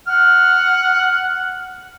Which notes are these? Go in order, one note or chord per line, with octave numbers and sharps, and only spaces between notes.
F#5 F6